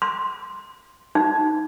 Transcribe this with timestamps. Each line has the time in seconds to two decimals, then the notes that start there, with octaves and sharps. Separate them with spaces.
0.02 C6
1.15 D#4